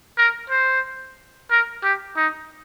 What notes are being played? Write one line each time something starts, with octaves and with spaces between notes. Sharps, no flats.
A#4
C5
A#4
G4
D#4